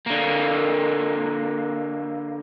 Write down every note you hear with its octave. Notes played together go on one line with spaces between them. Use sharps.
D3 A#3